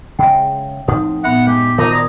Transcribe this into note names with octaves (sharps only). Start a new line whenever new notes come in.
C#3 G#3 E5 F#5 G5
A2 F3 C4 D#4 C#5 F#5 D#6
A#2 B3 E5 F#5 B5
G2 G#3 G4
D#3 D#4 F4 A#4 C5 A5 D6
F#4 D5 A#5 D#6